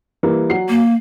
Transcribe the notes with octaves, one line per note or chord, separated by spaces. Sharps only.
E3 G3 A#3
F#3 F#5 C7
A#3